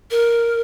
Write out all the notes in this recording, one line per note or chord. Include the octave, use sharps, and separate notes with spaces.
A#4